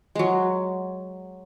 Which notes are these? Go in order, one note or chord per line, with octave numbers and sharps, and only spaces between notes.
F#3 G#3